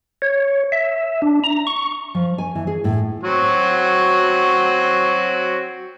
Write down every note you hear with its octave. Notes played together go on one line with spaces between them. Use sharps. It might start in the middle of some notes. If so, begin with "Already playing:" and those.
C#5
E5
D4
A#5
C#6
F3
G#5
E3
G#4
A2
F#3 C4 F#4